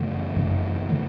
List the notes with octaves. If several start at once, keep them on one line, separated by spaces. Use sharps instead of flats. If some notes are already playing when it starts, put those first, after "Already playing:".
Already playing: F#2 C#3 E3 A3
F#2 C#3 E3 A3
C#3 E3 A3